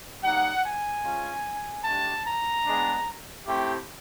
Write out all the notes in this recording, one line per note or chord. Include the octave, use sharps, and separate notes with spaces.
G3 A#3 D#4 F#5
G#5
G#3 C#4 F4
A3 D4 G4 A5
A#5
G#3 B3 D4
A3 C4 E4 G4